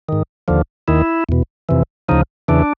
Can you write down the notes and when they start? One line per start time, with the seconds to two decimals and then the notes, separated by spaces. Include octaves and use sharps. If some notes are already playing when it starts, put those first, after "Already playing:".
0.09 G#2 D#3
0.48 D#2 D3 F3
0.88 D#2 D#3 E4
1.29 E2 B2
1.69 F2 C3 E3
2.09 D2 C#3 F3 D#4
2.48 E2 C#3 E3 D4